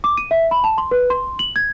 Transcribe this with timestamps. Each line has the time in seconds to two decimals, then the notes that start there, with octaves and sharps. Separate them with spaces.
0.04 D6
0.17 D#7
0.31 E5
0.51 B5
0.64 A5
0.78 C6
0.91 B4
1.10 C6
1.39 F#7
1.56 G#6